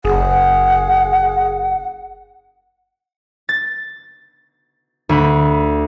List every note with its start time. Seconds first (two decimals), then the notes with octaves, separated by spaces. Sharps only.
0.05 F#1 G#4 F#5
3.49 A6
5.09 D2 B5